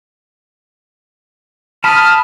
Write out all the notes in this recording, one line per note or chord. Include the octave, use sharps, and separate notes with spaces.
A5 B5 D#6 F6